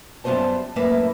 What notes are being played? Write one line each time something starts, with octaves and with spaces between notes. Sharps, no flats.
F#2 G3 B3 F4 C5 A5
F#2 A2 A#3 B4 E5